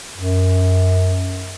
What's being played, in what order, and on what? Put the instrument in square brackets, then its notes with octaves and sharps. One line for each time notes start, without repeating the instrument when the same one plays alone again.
[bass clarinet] F#2